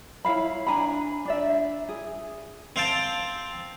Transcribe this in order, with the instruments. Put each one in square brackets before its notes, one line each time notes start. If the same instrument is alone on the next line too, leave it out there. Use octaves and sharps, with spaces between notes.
[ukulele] E4 C#5 F5 B5
D4 G#5 A#5 B5
D4 D5 E5
G#4
[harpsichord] C4 F5 G5 A5